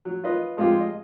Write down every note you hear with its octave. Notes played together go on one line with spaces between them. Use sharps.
F#3
F4 B4 D#5
F3 G#3 C4 F4 G4
D#5